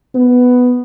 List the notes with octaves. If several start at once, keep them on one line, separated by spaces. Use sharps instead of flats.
B3